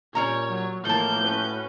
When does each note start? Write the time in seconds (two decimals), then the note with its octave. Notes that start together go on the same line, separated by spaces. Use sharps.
0.15 A#2 G3 C#4 C#5 A#5
0.47 F#3
0.85 A2 E3 F3 A#3 A5 G6
1.22 C#4 F#4 B4